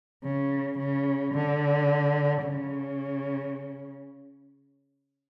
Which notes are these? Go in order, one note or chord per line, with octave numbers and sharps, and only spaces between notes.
C#3
C#3
D3
C#3